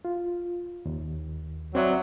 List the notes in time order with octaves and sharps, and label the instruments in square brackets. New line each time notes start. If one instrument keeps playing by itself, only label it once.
[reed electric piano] F4
D#2
[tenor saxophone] F#3 [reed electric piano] C4 D5 E5